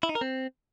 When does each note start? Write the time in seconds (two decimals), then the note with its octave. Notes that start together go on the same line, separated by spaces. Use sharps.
0.03 E4
0.09 D#4
0.15 A#4
0.21 C4